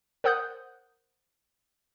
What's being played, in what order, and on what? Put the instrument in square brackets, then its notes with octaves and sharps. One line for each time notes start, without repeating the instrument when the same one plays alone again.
[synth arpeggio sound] A#4 C5 F#5 D#6 F#6 G6